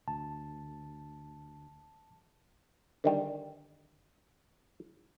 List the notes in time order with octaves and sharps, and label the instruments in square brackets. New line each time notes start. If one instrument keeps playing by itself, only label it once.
[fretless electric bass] D2 [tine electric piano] A5
[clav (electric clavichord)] D3 D#3 G3